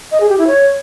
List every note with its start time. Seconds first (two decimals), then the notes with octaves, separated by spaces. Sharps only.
0.12 D#5
0.20 G#4
0.29 G4
0.38 E4
0.47 C#5